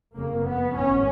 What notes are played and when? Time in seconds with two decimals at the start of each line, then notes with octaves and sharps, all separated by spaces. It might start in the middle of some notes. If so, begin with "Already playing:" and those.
0.15 F#1 F2 C#3 A#3
0.45 B3
0.74 G#1 G#2 C#4